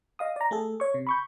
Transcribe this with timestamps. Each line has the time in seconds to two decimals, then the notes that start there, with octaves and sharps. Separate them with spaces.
0.19 D#5 F5 D#6
0.36 D5 A#5
0.51 A3 G#4 A4
0.80 C#5 C#6
0.94 C3
1.07 B5 C#6 G6